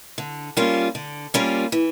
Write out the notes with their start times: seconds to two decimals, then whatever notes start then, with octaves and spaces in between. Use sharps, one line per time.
0.18 D3
0.57 G3 A#3 C#4 F4
0.95 D3
1.34 G3 A#3 C#4 F4
1.72 E3